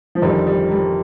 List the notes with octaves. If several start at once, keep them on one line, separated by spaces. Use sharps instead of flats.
F3
G1 F2 D#3 G3
G3
G3